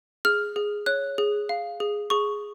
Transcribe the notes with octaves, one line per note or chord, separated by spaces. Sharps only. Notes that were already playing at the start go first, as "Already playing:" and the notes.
G#4 F6
G#4
C#5 F#6
G#4
F5
G#4
G#4 C#6